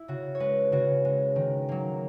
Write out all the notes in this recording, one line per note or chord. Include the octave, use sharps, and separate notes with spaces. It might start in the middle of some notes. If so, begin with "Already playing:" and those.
Already playing: E4
C#3 F#4
C#5
G#3 B4
C#3 F#4
G#3
D#3
F#3 A#3